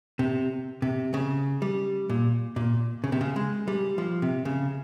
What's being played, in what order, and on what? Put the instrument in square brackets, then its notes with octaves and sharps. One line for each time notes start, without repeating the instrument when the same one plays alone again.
[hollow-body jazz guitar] C3
C3
C#3
G3
A#2
A#2
C#3
C3
C#3
G#3
G3
F3
C3
C#3